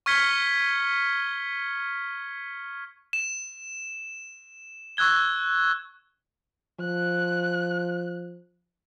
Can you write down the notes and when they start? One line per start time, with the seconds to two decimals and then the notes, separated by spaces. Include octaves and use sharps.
0.06 C#6 F6 G#6 B6 C#7 G7
3.13 E7
4.97 C#6 E6 F#6 G#6 G7
6.80 F3 F#6